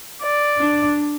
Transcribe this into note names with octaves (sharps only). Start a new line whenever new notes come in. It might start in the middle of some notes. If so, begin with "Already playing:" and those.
D5
D4